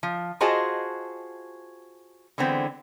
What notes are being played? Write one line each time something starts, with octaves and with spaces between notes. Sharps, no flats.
F3
F4 F#4 G#4 C5 D#5 A5
D3 E3 G#3 B3 C4